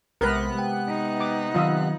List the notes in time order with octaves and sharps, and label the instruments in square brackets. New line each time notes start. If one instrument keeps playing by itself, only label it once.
[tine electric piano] B1 G#3 [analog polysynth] C3 B3 F#6 [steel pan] A#4 B4
[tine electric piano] G#3 G5
[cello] D#4
[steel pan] D6
[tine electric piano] D#3 F#3 [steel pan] F4 D#5 E5